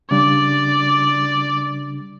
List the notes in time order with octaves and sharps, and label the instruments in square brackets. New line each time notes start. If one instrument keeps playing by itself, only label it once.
[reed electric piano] C#3 G3 D4 [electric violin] D5